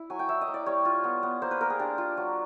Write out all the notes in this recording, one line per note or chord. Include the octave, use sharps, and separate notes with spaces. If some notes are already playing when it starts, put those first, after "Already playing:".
Already playing: E4
F#3 G#5
G5
E4 E5
D#5
A#3
D5
G3 C#5
F4
B3
B3
A#3 C5
B4
A#3 A#4
G#4
D4 G4
F4
F#3